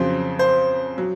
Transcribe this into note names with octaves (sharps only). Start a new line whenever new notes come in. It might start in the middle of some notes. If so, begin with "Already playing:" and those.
Already playing: F2 C#3 F#3 C5
C5
F#3